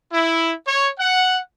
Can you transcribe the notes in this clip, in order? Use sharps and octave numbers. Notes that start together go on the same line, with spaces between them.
E4
C#5
F#5